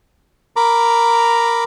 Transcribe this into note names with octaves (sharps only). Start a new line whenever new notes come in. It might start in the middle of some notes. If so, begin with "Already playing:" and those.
A#4 A#5 B5 D6